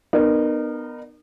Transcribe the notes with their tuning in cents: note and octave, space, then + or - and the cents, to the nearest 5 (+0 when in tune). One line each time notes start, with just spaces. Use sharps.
B3 +0 D#4 -40 A#4 +0